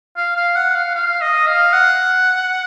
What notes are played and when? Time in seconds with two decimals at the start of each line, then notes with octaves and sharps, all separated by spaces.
0.17 F5
0.36 F5
0.56 F#5
0.75 F5
0.95 F5
1.21 D#5
1.47 F5
1.73 F#5